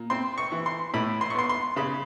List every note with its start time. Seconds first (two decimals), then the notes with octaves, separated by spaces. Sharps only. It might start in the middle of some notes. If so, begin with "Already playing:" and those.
Already playing: A#2
0.10 C4 C6
0.38 C#6
0.52 E3
0.66 C6
0.94 A2 B5
1.21 C6
1.30 C#6
1.35 B3 C6
1.49 C6
1.76 C#3 B5